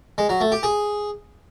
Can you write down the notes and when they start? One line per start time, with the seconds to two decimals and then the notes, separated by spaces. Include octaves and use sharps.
0.18 G#3
0.29 F#3
0.41 A3
0.52 G4
0.63 G#4